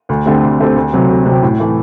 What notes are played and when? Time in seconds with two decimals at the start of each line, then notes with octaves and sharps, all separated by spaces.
0.09 D2
0.25 D3 A3 C4 G4
0.43 D2
0.59 D3 A3 C4 G4
0.76 D2
0.93 C3 F#3 C4 G4
1.09 D2
1.26 C3 F#3 C4 G4
1.43 A2
1.60 E3 A3